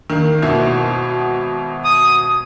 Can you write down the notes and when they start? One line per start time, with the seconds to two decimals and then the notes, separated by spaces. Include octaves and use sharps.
0.10 D#3 A#3
0.42 G#1 B2 E4
1.85 D#6